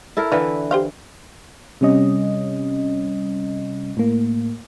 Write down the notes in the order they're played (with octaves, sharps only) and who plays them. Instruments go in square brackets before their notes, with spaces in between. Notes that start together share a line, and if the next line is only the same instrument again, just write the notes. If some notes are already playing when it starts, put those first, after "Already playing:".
[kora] E4 A4 A#4
[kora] D3 E3 B4 [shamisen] F5
[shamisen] G4 C5 F5
[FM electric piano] C3 G3 C#4 D#5
A2 A#3